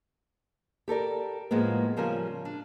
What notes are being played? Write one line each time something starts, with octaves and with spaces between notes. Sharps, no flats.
G4 A4 A#4 D5
A2 F3 G#3 A#3 B3
C#3 F3 G3 A#4 G#5
D4